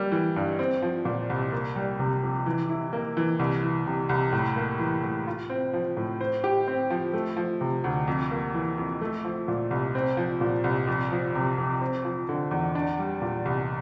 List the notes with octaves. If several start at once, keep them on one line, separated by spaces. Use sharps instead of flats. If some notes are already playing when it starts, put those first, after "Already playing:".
Already playing: G3 A#3
E3
G2
C4
F3
A#2
C2
A#3
G3
C3
F2
E3
E4
A#3
E3
C2
E3
C3
C2
A2
A#3
E3
A2
F4
C4
F3
A2
C5
G4
C4
F3
A3
F3
C3
D2
F2
A#3
E3
F2
A3
F3
A#2
C2
C4
F3
A#2
C2
F2
F3
C3
F2
C4
F3
D3
E2
D4
G3
A#2
C2